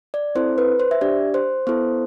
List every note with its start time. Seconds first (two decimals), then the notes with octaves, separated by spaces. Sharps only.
0.14 D5
0.35 C4 E4 A4 C5
0.58 B4
0.80 C5
0.91 E5
1.01 D4 G4 D5
1.34 C5
1.67 B3 E4 A4 C5